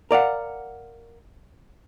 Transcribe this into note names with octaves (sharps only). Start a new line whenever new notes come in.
A#4 D5 F5 F#5